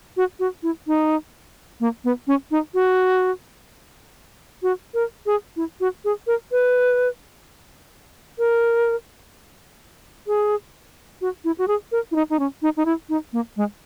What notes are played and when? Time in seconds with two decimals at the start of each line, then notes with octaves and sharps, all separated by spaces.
0.17 F#4
0.39 F#4
0.63 E4
0.87 D#4
1.80 A#3
2.04 B3
2.27 C#4
2.51 D#4
2.74 F#4
4.63 F#4
4.94 A#4
5.26 G#4
5.56 E4
5.80 F#4
6.05 G#4
6.27 A#4
6.52 B4
8.38 A#4
10.27 G#4
11.21 F#4
11.44 E4
11.58 F#4
11.68 G#4
11.92 A#4
12.11 E4
12.15 D#4
12.30 D#4
12.39 C#4
12.62 D#4
12.77 D#4
12.85 E4
13.09 D#4
13.33 A#3
13.56 G#3